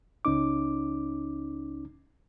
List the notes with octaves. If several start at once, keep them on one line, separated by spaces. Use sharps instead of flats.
C#2 C#4 D#4 D6